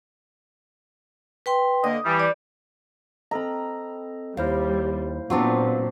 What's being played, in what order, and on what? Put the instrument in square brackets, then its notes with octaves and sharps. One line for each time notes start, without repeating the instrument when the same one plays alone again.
[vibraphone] B4 G5 C6
[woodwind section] D3 A#3 D#5 [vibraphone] D#6
[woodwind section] E3 G3
[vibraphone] D5
[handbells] C4 A4 D#5 [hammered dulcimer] A#5 B5
[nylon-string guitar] D#2 [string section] G3 [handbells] E4 C5 F5
[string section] A#2 [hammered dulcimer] F#3 C4 D4 [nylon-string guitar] B3 F4